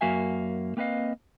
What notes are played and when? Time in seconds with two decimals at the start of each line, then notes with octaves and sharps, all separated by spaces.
0.01 F#2 A#3 F#4 E5 F5 G#5
0.77 A#3 C4 B4 D#5 F5